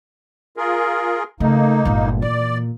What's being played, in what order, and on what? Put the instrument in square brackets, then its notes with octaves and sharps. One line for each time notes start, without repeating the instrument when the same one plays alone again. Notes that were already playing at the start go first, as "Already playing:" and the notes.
[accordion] F4 G#4 A#4
[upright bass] C#3 [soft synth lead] A3 [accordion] A#3 D#4
[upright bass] G1 G#3 [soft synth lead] A#2
[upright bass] E3 [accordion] D5